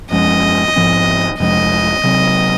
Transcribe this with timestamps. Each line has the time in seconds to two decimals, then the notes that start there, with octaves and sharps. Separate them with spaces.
0.11 F#2 F3 G#3 C#4 D#5
0.76 G#2 F3 C4
1.40 F2 C3 F3 G#3 D#5
2.04 C3 F#3 C4